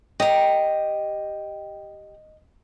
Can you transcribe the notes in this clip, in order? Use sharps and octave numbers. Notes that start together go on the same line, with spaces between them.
G4 D#5 A#5